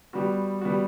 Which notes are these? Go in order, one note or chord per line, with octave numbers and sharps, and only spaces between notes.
G3 B3 F#4
G3 B3 F#4